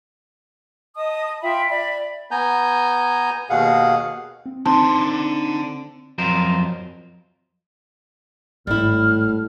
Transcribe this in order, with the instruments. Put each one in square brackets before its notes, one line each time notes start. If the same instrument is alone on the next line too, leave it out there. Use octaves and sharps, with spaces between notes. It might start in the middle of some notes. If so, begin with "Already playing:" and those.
[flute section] D#5 A5 D#6
F4 E5 G5 B5
D5 E5 B5
[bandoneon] B3 G#5 A#5 G6
D#2 B2 G#4 F5 F#5
[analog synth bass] C4
[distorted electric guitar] D3 C6 [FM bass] C4 [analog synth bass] D#4 [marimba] A5
[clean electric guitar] F2 F#3 A#4 C5
[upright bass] G#1 [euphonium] A2 [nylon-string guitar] G3 E4 [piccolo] F6